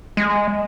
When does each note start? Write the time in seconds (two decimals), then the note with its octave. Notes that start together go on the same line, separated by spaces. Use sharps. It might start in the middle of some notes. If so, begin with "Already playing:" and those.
0.17 G#3